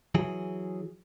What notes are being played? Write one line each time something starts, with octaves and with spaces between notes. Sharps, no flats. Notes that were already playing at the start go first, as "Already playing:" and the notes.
E3 F#3 G#4